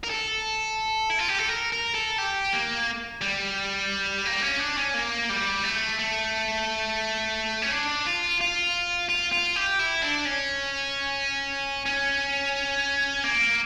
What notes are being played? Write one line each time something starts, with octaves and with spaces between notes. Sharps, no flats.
A#4
A4
E4
F4
G4
A4
A#4
A#4
A4
G4
A#3
G3
A#3
C#4
D4
C#4
A#3
G3
A3
A3
C#4
D4
F4
F4
F4
F4
G4
E4
D4
C#4
C#4
A#3